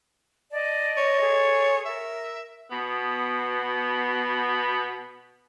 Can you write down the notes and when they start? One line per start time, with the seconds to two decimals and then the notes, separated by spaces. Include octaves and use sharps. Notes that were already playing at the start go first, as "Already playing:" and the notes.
0.51 D5 D#5 A5
0.97 C#5
1.21 G#4 A4
1.86 A#4 E5
2.71 B2 B3